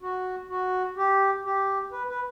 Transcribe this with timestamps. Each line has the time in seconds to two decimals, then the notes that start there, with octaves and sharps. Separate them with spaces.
0.02 F#4
0.49 F#4
0.97 G4
1.45 G4
1.92 B4
2.09 B4